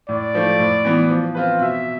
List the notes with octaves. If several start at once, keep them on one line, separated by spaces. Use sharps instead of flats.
A2 D5
F3 A3
A2
E3 B3
F3
C4 F4 B4
B2 E5